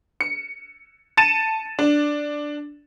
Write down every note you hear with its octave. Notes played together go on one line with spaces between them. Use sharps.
C#7
A5 A6 C#7 D#7 E7
D4